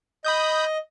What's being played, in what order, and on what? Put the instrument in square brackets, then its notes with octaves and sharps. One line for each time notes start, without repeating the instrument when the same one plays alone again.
[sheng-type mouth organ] D#5 [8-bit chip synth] B5 D#6 G6